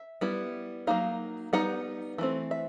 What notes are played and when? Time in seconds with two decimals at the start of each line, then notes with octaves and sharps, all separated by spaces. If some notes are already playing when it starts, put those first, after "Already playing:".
Already playing: E5
0.21 G3 B3 E4
0.87 F#3 A#3 D#4 F5
1.53 G3 B3 D#4 F#5
2.18 E3 A3 C4
2.51 E5